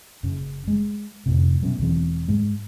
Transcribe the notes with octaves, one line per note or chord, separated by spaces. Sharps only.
F#1 C#3
G#3
F2 A2 C3
B2 F#3 B3 C#4
E1 E3 C4
G#2 G#3